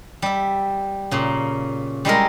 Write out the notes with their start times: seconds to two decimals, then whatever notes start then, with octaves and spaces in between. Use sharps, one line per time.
0.22 G3 E5
1.11 A#2 C#3
2.05 G3 G#3 E4 A#4